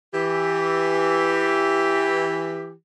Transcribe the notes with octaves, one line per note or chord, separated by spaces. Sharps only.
E3 G4